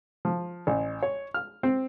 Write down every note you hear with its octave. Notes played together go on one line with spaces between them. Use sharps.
F3
A1
C#5
F6
C4